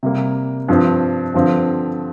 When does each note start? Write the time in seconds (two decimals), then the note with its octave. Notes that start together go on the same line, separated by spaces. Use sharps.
0.03 C3 G3 A#3
0.68 G2 F3 C4
1.34 G2 D3 F3 C4 F4